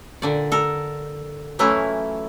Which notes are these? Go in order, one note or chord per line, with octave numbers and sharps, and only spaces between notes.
A#2 D3 D5
A4 A#4
E3 F#3 A3 C#4 E4 F4